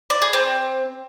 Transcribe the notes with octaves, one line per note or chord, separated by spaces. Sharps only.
D5
G#4
C4